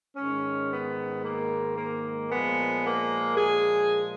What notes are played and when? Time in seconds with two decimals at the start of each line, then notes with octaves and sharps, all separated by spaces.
0.16 G#2 D#3 G#3 C#4
0.69 B3
1.23 A#3
1.76 A#3
2.30 A#2 F3 G#3 B3
2.84 A#3
3.37 G#4